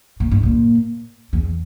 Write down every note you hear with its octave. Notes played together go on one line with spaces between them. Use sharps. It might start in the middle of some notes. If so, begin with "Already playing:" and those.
A#2
G#2
A#2
E2